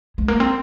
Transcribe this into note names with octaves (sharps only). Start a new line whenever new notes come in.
G#3
A#3
C4